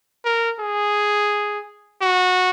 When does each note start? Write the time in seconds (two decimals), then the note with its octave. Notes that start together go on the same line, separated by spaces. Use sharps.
0.25 A#4
0.60 G#4
2.02 F#4